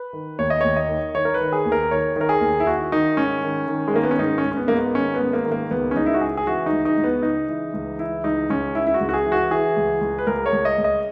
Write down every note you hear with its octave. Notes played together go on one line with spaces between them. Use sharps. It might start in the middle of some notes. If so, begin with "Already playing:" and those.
Already playing: B4
D#3
D#2 C#5
D#5
D#2 C#5
D#5
D#3
D#3 C#5
A#4
B4
D#3
G#4
D#2
A#4
D#3 C#5
D#3 A#4
G#4
D#2
E4
D#3 F#4
D#3 D#4
G#2 C#4
D#3
D#3
G#3
D#3 A#3
B3
C#4
G#2 D#4
C#4
G#2
C#4
B3
G#2 A#3
B3
D#3 C#4
B3
G#2
A#3
D#3
A#3
C#2 B3
C#4
C#2 D#4
E4
F#4
C#3 G#4
G#4
E3 F#4
D#4
C#2
D#4
C#2
B3
C#3 D#4
E3
C#2
E3 E4
C#2 D#4
C#2 C#4
C#3 E4
E4
F#4
C#2
F#4
G#4
E3
F#4
E3 G#4
C#2
C#2
B4
C#2 A#4
C#5
C#2
D#5
C#2
D#5